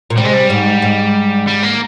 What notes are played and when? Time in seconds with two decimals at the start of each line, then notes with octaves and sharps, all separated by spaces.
0.10 A#2
0.17 C3 G3
0.25 G#3
0.34 G3
0.50 G#2
0.82 G#2
1.48 G3
1.63 A#3